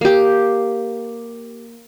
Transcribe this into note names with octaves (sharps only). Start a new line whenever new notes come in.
A#3 G4